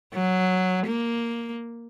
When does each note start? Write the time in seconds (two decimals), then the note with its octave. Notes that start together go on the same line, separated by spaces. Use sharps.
0.14 F#3
0.87 A#3